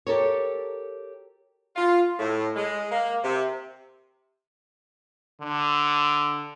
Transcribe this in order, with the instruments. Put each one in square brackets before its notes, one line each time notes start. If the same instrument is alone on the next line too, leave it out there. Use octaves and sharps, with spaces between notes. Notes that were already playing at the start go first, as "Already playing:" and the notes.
[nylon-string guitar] G4 A4 A#4 C#5
[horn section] F4
A2
G#3
A#3
C3
[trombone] D3